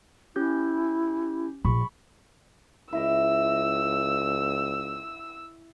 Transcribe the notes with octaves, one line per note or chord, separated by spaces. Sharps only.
C#4 E4 G4 G6
A#1 B5 C#6
C#2 E4 D#5 D6 E6